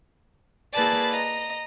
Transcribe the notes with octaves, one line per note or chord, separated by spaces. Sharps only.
A#3 E4 G#4 B4 D5 A5
D#5 A#5